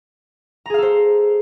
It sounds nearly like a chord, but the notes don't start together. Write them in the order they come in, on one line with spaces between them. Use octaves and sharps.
A#5 G#4 F5 A4 C5